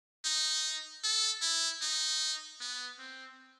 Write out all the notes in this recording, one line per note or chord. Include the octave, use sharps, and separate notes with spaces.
D#4
A4
E4
D#4
B3
C4